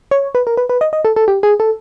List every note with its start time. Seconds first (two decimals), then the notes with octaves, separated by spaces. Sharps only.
0.11 C#5
0.35 B4
0.47 A#4
0.57 B4
0.69 B4
0.81 D#5
0.93 D#5
1.05 A4
1.16 A4
1.28 G4
1.43 G#4
1.60 A4